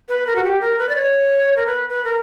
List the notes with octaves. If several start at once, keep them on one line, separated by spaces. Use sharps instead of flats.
B4
A#4
F#4
G4
A#4
B4
D5
C#5
A#4
B4
B4
A#4